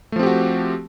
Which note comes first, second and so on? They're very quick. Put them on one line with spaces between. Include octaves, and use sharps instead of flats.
A3 F3 C4 G4 F#4